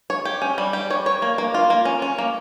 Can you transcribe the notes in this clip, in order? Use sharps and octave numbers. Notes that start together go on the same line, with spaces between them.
C#5
G4
C#4
G3
G4
C#5
C#5
A#3
A#3
F4
A#3
C#4
C#4
A#3